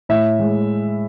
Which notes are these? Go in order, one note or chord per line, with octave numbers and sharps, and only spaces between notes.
A2 E5
G#3